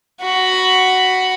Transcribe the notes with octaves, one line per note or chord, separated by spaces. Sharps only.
F#4 B5